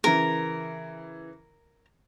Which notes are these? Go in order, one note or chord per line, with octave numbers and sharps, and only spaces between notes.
C#3 E3 A#4